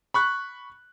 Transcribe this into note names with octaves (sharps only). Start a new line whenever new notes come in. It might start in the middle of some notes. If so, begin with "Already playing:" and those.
B5 C#6 F#6